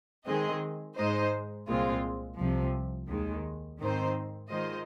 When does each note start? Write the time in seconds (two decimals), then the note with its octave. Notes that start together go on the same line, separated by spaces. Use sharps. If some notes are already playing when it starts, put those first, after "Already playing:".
0.26 D#3 G#3 C4 G#4 D#5
0.97 G#2 G#3 D#4 C5 D#5
1.68 C2 A#2 G#3 C4 F4
2.39 C2 C3 F3
3.09 D#2 D#3 G#3
3.80 G#2 D#3 C4 D#4 C5
4.51 D#3 G#3 F4 C5 D#5